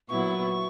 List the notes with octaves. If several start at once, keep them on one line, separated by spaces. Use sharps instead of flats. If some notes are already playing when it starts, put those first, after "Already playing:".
A#2 F#3 B3 E4 C#6